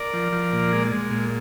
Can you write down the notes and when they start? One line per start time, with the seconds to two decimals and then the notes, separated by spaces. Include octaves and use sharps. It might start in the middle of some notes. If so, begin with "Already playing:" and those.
Already playing: A#4 D5
0.14 F3
0.32 F3
0.52 A#2
0.73 G#3
0.92 G#3
1.10 A#2